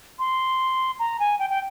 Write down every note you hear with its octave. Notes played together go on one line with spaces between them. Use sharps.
C6
A#5
G#5
G5
G5